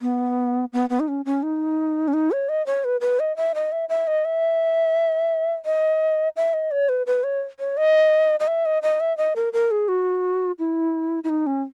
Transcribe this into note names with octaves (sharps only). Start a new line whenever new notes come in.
B3
B3
B3
D#4
C#4
C#4
D#4
C#4
D#4
C#5
D#5
C#5
B4
B4
D#5
E5
D#5
E5
E5
D#5
E5
D#5
E5
D#5
C#5
B4
B4
C#5
C#5
D#5
D#5
E5
D#5
D#5
E5
D#5
A#4
A#4
G#4
F#4
E4
E4
D#4
C#4